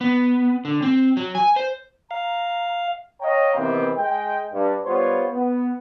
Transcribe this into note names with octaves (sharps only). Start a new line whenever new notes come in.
B3
D3
C4
F#3
G#5
C5
F5 A#5
C#5 D#5 F5 G5 A#5
C3 D#3 E3 B3 C4
G#3 G5
G2
G3 B3 F4 C5 C#5
B3